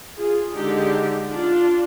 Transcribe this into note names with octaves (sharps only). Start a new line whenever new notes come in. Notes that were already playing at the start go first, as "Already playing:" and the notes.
F4 G#4
D3 G#3 D4 D#4 G4
D4 F4